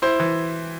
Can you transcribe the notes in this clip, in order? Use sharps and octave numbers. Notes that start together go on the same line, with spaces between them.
E4 C5
E3